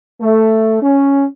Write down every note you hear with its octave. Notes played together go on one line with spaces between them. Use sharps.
A3
C#4